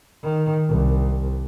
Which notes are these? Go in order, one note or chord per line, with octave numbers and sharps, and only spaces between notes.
D#3
C2